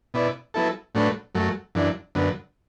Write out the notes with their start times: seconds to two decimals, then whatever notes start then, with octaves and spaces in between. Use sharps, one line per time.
0.14 B2 B3 E4 D5
0.54 F#3 B3 E4 A4
0.95 A2 F#3 A3 D4 B4
1.35 F#2 F#3 A3
1.75 F#2 E3 D4
2.15 F#2 D3 B3